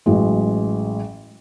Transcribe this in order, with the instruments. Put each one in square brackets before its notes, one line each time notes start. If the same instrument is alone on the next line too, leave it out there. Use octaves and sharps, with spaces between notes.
[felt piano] A1 F#3 G#3